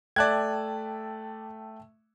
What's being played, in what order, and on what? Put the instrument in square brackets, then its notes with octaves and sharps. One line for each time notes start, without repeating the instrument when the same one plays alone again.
[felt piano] A3 E5 [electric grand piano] D5 F#6 G#6 [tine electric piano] G5 A5